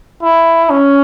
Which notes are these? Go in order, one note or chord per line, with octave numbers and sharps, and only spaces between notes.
E4
C#4